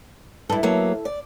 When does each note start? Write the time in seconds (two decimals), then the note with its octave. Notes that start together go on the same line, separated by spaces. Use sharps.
0.50 G2 E4 A4
0.63 F#3 A#3 B3
1.05 D5